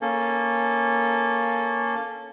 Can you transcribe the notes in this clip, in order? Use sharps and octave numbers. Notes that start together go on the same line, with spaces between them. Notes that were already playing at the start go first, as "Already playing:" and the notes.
A#3 C#4 A4